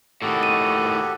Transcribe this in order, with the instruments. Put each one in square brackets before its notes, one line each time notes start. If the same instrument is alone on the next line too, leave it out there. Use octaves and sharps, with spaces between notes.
[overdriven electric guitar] A2 D#3 [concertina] F#4 G4 A4
[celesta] D#7